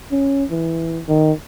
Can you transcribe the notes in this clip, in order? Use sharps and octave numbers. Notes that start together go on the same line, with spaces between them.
C#4
E3
D#3